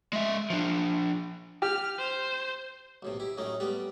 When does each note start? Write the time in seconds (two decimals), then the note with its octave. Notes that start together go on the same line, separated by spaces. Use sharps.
0.13 G#3 E5
0.50 F3 D4
1.62 G4 F6
1.98 C5
3.03 B1 A2 C3
3.20 E4 G4
3.37 F#2 A2 A3 C#4 D#4
3.60 G3 A3 B3 G4